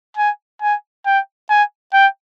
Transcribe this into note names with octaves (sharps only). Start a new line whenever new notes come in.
G#5
G#5
G5
G#5
G5